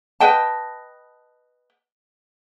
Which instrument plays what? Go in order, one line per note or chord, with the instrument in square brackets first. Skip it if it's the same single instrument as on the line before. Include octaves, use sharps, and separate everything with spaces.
[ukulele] B4 D#5 G5 A5